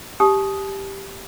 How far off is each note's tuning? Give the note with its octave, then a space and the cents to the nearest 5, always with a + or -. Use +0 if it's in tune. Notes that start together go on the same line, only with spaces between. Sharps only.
G4 +0 A5 -45 D#6 +0